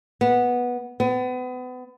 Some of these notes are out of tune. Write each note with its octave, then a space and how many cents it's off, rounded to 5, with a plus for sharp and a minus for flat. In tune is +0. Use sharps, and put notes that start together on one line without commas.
B3 -10
B3 +35